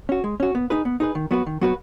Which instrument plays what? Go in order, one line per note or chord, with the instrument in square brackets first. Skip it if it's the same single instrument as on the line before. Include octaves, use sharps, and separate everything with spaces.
[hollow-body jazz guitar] C#4 F#4
G#3
C#4 F#4
B3
D#4 G#4 B4
B3
D#4 G#4 B4
D#3
F#3 B3 F#4 B4
D#3
F#3 B3 F#4 B4